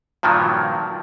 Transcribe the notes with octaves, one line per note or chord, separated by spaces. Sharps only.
G2 A#2 D#3 F3 F#3